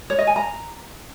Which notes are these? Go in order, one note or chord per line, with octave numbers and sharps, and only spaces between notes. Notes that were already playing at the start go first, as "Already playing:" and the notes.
C#5
D#5
G#5
A#5